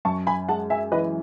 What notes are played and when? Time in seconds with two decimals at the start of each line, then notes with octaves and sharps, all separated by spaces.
0.05 F#2 A5 C#6
0.27 G#5 B5
0.49 G#3 F#5 A5
0.70 E5 G#5
0.92 E3 B4 D#5